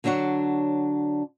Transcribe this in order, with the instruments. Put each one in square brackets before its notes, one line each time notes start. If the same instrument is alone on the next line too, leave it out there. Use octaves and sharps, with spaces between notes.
[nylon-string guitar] D3 F#3 D4 C#5 F#5